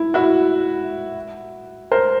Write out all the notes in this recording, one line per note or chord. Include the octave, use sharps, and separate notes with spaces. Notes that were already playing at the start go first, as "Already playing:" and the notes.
Already playing: E4
E4 F#4
A#4 C5